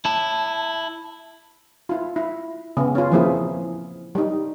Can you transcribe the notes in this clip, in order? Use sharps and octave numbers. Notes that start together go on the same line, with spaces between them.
E4 A5
E4 F4
E4
C#3 B3
C#4 F4
E3 F3 A#3 C4 E4 G#4
G3 D#4